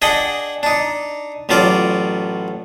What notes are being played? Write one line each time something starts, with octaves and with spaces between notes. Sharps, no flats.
D4 G#4 D#5 F#5 G5
D4 D#4
A1 A2 F#3 F4 D5 D6